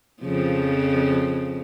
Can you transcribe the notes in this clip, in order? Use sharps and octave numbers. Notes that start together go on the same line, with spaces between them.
F2 C#3 F3